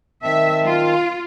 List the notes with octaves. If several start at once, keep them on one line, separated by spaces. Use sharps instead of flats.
D#3 C4 E5 A5
F4